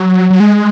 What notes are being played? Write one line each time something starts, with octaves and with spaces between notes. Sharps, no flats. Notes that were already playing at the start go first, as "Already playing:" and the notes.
Already playing: F#3
F#3
G#3